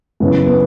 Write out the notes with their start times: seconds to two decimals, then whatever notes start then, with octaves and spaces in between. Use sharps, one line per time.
0.20 F#2 C#3 E3 B3
0.46 B3